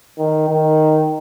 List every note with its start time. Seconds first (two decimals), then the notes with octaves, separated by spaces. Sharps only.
0.18 D#3
0.49 D#3